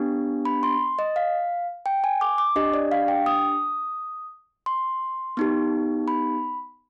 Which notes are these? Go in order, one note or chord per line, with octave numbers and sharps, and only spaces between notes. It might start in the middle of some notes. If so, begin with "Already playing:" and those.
Already playing: B3 D4 G4
B5
C6
D#5
F5
G5
G#5
D6
D6
D4 G4 D#5
D5
F5
G5
D#6
C6
B3 D#4 G4
B5